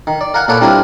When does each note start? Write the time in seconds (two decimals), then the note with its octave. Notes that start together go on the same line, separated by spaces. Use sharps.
0.07 D#3
0.21 D5
0.34 A#4 F5 F#5 G#5
0.48 A#2 A#3 A4 B4 C#5 D5
0.61 G3 C4 D4 E4 F4 A#4